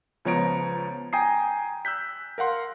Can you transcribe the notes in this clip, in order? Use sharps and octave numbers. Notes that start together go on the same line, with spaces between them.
C#2 F3 B3 C#5 A#5 D7
G5 G#5 A#5 D#6 C7
E6 F#6 G6 B6
A#4 F5 F#5 C6